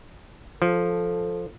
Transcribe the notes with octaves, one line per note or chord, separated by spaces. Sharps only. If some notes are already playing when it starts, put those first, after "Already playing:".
F3 A4